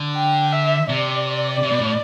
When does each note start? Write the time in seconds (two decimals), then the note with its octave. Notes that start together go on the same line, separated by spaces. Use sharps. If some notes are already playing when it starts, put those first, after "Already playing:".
Already playing: D3
0.16 G5
0.52 E5
0.89 C3 D5
1.63 C3
1.71 B2
1.80 A2